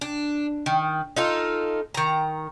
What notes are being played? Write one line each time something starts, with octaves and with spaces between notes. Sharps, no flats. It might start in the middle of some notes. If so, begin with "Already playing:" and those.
D4
D#3
D#4 F4 A4
D#3 A#5